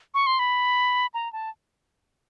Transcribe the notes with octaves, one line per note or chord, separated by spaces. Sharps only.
C#6
C6
B5
A#5
A5